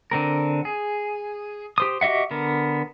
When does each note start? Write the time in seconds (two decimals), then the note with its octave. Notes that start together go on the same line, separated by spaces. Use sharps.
0.11 D3 C4 A#4
0.65 G#4
1.78 G4 C5 D#6
2.01 F#4 G4 D#5 E5 F#5
2.31 D3 B3 A#4